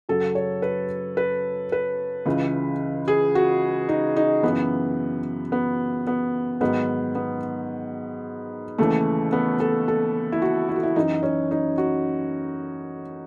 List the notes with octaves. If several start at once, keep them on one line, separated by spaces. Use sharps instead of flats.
F#2 C#3 F#3 A4
C#5
B4
B4
B4
C#2 C#3 E3
G#4
F#4
D#4
D#4
F#2 C#3 E3 B3
B3
B3
G#2 D#3 F#3 B3
B3
D#2 C#3 E3 A3
B3
A4
A4
E4
F#4
E4
F#4
E4
F#2 E3 D#4
C#4
D#4
F#4